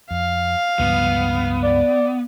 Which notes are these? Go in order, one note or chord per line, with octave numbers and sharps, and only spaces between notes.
F2 F5
C#2 G2 F3 B3
D5